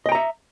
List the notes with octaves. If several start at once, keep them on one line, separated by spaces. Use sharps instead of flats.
D#5 E5 G5 A#5